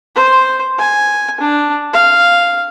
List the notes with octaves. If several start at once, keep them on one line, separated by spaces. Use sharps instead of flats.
C5
G#5
D4
F5